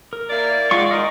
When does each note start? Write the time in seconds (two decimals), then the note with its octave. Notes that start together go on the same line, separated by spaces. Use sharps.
0.13 A#4
0.30 A#3 E4 D5
0.71 D#3 G#3 F4 F#4 D5 C#6
0.91 D#4 A#4 D#5